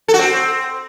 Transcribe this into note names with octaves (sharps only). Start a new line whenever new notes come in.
A4
F#4
C4